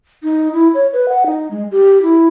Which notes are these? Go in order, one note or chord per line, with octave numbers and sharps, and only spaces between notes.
D#4
E4
C#5
B4
F#5
D#4
G#3
G4
E4